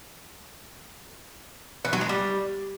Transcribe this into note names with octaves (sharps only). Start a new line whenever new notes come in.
E3
F#3
G#3
G3